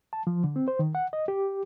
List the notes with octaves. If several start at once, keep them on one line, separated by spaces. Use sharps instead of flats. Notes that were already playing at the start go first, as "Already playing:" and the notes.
A5
F3
D3
C4
C5
D#3
F#5
D#5
G4